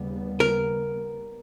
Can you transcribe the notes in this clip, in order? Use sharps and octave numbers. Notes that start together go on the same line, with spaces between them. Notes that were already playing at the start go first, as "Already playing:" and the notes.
Already playing: D#2 C#3 G3 B3
A#4